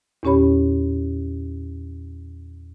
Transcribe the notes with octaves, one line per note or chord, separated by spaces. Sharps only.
E2 A#2 C#4 G4 C#5 B5